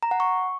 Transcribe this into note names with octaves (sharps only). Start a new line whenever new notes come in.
A#5
F#5
C#6